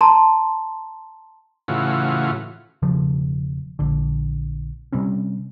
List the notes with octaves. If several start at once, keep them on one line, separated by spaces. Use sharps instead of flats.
A5 A#5 C6
A2 C#3 E3 F4 F#4
E1 C#3 F3
A#1 D3
C3 G3 C4 C#4